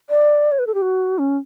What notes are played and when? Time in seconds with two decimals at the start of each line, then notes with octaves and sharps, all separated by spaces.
0.10 D5
0.52 C#5
0.59 B4
0.67 A4
0.74 G4
0.82 F#4
1.18 C#4